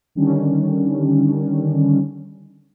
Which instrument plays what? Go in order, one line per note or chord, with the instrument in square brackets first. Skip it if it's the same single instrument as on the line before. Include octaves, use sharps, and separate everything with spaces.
[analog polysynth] D3 D#3 G3 C#4 D4